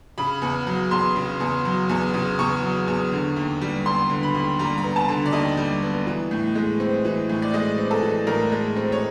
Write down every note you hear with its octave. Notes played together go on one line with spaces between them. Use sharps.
C#3 B5
E2
F#3
E2 C6
C#3
E2
F#3
E2
C#3
E2 C#6
F#3
E2
D3
D#2
G3
B3 C6
D3
B5
D#2
G3 A#5
A#5
B3
A5
D3
D5
D#2 D#5
G3
B3
E3
A2
G#3
C4
E3
A2
D5
G#3 D#5
C4
A4
E3
A2 A#4
G#3
C4
C#5